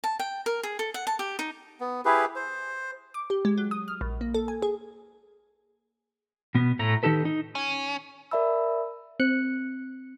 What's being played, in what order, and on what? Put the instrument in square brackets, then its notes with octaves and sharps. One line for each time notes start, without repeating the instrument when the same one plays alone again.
[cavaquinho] A5
G5
A#4
G#4
A4
F#5
A5
G4
D#4
[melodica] B3
E4 G4 G#4 B4
C5
[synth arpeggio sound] D6
G4
G#3
F#3
D#6
F6
A#1
A#3
A4
G#5
G#4
[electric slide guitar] B2 B3
A2 A3 A#5
D#3 D#4 G4 A4 B4
D#4
[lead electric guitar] C#4
[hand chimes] A#4 D5 E5 A5 B5 E6
[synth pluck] C4 F#6 C#7